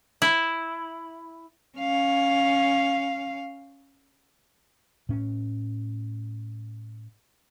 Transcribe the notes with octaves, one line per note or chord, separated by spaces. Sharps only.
E4
C#4 F5
A2 C#4